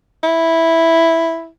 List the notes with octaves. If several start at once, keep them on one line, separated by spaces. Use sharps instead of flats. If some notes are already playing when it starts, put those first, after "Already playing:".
E4